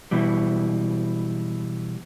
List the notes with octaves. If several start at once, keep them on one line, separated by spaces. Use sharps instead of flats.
B2 E3 G3